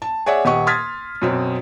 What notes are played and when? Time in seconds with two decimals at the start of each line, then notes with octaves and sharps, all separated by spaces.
0.02 A5
0.26 G#4 C#5 D5 E5 F#5
0.45 D#1 G4 D#5 F#5 C#6
0.67 C6 D#6 F6 G#6 A6 B6
1.22 F#2 B2 C4